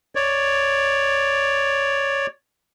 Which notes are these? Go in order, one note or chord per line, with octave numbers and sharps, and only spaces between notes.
C#5 D5